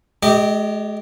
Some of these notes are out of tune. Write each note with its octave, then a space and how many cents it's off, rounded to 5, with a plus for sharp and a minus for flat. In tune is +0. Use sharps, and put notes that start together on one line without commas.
G#3 +40 G4 -10 D#5 -25